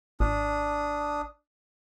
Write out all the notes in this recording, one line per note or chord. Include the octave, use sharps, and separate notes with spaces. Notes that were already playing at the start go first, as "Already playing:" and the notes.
G#1 D4 D#6